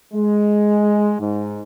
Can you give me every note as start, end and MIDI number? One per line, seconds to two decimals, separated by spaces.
0.14 1.14 56
1.19 1.59 44